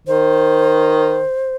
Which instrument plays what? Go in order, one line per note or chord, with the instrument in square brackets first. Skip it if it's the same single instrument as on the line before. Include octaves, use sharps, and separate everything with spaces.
[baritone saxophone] D#3 [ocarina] C5